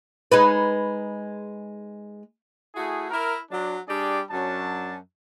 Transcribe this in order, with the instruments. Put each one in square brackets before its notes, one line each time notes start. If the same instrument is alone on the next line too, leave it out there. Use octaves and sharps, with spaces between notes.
[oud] G#3 D#4 B4
[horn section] A3 E4 F#4 G#4
E4 A#4
F#3 D4
G3 D4 G4 G#4 D5
F#2 F#3 C#4 D4 A5